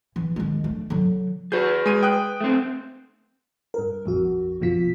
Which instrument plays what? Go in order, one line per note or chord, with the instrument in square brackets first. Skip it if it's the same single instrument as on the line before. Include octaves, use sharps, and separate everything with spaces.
[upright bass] E3
D#3 G#3
A3 D4
D3 F#3
[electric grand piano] F#4 G6 [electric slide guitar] G#4 B4
[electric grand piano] G#3 D#7
G5 D#6 F#6
[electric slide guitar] A3 C4
[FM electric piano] G2 A#4
A#1 F2 F#4
A#1 F2 B2 F3 F4 B6